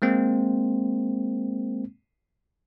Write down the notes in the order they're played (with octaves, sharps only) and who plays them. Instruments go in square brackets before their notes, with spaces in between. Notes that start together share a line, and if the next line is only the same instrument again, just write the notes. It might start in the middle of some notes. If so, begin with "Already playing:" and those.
[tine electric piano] G#3 A#3 C4